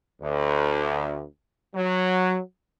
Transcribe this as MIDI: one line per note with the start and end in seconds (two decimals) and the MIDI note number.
0.22 1.24 38
1.75 2.39 54